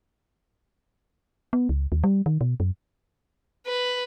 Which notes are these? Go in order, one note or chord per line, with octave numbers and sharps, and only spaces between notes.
B3
C#2
D#2
G3
D#3
B2
F#2
B4